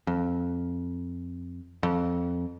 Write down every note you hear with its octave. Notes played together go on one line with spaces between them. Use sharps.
F2
F2